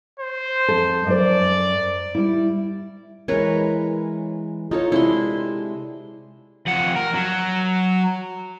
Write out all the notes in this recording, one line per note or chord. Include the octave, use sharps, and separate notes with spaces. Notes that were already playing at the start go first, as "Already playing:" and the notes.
C5
F2 A4
F#2 C5 D5
G3 E4
E3 G#3 A#4 B4 C#5
D#4 F4 A4 C#5
C3 G#3 D4 E4 C6
F2 F#5
A#4
F#3